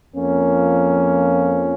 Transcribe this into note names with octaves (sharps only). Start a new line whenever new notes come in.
F2 F3 A#3 C#4